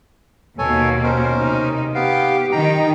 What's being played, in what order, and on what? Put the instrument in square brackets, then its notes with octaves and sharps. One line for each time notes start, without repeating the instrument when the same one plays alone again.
[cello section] D#2 B2 A#3 [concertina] A4 C#5 G#5
[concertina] C#4 A#4 C5
[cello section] C3 D#4
[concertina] B3 F5 [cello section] G4
[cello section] D#3 D#4 [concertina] G5 A#5